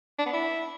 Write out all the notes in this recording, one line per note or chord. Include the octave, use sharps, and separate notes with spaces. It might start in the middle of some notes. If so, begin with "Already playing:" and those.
D4
B3
E4